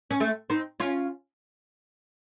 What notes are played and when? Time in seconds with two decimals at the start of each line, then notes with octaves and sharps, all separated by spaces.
0.11 C#4
0.20 A3 C4
0.50 C4 D#4
0.80 C#4 F4